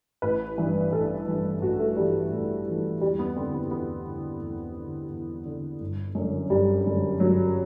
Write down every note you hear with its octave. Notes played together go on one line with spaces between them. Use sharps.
A1 B4
G2 E3
A1 A4
G2 E3
A1 F#4
A3
G2 E3 G3
A1
G2 E3
E2 G3
B3
D3 C4
B3
E2 B3
D3
E2
D3
E2
D3
G1
F#2 D3
G1 G3
F#2 D3
G1 F#3